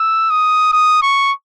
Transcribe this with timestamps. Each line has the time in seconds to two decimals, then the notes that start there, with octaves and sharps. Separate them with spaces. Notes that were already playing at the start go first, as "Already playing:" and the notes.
Already playing: E6
0.30 D#6
0.73 D#6
1.02 C#6